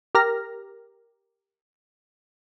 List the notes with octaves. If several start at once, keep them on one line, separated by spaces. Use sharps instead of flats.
G4 A#4 F6 A#6